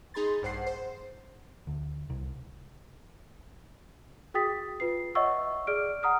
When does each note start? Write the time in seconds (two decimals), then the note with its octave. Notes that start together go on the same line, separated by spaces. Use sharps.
0.14 D#4 G#4 B5 C6 A6
0.42 A#1 G2 C5 F#5 C7
0.66 C5
1.67 D2
2.10 C2
4.34 F#4 G#4 G5 D#6 A6 B6
4.80 F4 B4 C7
5.15 C#5 D#5 E5 F#5 C#6 E6
5.67 G#4 D5 F6 D7
6.03 F#5 A#5 D#6 F6